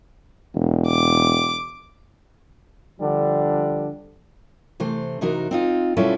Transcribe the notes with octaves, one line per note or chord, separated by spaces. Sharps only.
E1
D6
D3 F3 G3 D4
C3 E3 A3 C5
C3 E3 D#4 F#4 A#4
C4 D#4 F4
B2 G3 C#4 E4 F4 A4